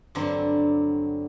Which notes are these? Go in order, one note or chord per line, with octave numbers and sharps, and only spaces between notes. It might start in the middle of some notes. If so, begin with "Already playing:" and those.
G2 D3 F#3 C4